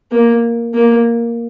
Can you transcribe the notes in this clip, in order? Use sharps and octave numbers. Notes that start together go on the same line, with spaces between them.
A#3
A#3